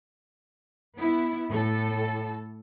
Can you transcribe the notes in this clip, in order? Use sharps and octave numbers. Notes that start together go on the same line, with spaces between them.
B3 E4
A2 A4